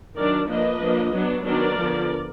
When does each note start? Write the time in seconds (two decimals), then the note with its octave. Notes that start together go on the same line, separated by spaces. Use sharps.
0.16 D#3 F#3 D4 A#4 D5
0.49 F3 A#3 D4 B4 D#5
0.81 F3 A#3 D4
1.14 F#3 B3 D4
1.45 D#3 F#3 B3 D4 A#4 D5
1.78 D3 F3 B3